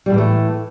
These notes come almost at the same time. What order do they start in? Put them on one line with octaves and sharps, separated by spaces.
G3 A2 E3 A3